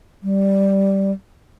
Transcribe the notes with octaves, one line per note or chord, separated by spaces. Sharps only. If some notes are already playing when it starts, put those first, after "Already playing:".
G3